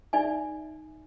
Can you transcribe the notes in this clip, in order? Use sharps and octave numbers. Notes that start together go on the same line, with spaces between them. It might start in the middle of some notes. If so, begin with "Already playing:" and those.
D#4 D5 E5 G#5